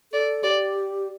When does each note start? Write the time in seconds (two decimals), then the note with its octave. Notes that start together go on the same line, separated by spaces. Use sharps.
0.13 A4 D5
0.43 G4 D5